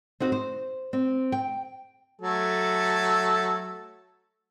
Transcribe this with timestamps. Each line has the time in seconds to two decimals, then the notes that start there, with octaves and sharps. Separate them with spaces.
0.20 C4 D#4 F#4 C5
0.32 C5
0.93 C4
1.32 G5
2.21 F#3 A3 A4